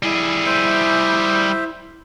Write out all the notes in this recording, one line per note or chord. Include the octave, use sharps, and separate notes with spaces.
G3 E4 G#4
C5 E5